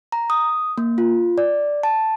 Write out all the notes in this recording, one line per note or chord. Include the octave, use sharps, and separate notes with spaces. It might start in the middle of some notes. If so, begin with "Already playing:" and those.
A#5
D#6
A#3
F4
D5
A5